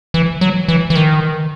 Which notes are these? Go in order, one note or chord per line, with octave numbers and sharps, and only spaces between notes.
E3
F#3
E3
E3
D#3